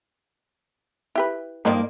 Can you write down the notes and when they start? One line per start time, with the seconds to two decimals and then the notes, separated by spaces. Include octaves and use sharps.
1.15 E4 G4 B4
1.65 G2 D#3 F3 A#3 D#4 D5